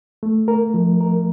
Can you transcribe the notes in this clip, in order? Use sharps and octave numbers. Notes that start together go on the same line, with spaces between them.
A3
A#4
F3
A#4